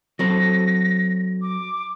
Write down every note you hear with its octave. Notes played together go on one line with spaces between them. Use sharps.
F#3 C4 A4 A#6
D6